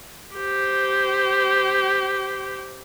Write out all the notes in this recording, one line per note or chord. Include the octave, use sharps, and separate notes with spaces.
G4 C5